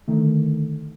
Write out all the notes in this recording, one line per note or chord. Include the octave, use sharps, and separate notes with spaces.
D3 D#3 A3